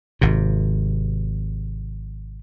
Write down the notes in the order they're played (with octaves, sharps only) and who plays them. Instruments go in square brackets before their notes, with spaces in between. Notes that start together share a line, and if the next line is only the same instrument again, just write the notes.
[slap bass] G#1 C3